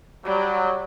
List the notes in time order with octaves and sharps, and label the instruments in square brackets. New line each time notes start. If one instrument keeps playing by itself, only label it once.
[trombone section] F#3 [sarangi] G3